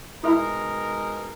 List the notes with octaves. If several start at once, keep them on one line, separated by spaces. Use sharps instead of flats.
B2 G#3 D#4 E4 A#4